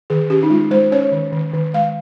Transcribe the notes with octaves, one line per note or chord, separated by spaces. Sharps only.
D#3 G#4
C#4 G4
D#4
G#3 F4
G#3 C5
C#4 C#5
D#3
D#3
D#3
G#3 F5